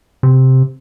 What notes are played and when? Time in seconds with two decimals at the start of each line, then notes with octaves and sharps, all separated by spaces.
0.23 C3